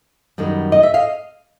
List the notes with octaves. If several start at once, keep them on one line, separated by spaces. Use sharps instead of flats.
F#2 D#3 G3 B3 D#4
D#5
E5
D#5 F5